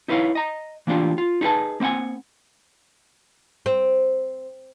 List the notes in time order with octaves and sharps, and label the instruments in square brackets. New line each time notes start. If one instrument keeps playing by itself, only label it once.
[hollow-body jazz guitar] D#4 E4 B4 C#5 F5
D#5 A#5
E3 A#3 D4 F4 G4
F4
D#4 G4 G#4 B4 A5
A#3 C4 E5 F#5 G#5
[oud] C4